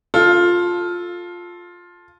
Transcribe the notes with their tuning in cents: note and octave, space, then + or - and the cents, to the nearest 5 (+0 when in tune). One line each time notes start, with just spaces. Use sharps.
F4 +10 A4 +0